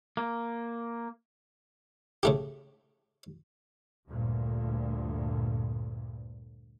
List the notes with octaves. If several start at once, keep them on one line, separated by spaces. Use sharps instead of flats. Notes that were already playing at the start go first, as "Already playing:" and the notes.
A#3
C#3 A3 G4
D2 G2 A#2